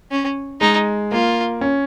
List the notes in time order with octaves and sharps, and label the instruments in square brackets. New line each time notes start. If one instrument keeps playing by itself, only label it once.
[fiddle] C#4
[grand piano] G#3 [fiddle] D#4
[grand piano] A#3 [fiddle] F4
[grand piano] C#4